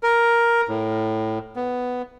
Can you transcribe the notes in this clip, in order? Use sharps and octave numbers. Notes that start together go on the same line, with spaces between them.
A#4
A2
B3